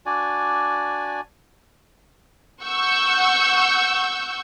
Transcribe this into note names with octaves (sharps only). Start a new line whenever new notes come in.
D4 F#4 D5 G#5
F#5 C#6 E6 G6